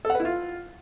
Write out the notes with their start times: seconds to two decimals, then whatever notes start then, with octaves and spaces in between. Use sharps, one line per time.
0.05 A4
0.10 F#5
0.15 B4
0.20 E4
0.25 F4